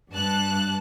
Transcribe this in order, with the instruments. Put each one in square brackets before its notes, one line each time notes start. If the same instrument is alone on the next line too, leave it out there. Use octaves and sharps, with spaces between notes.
[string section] G2 A5 F#6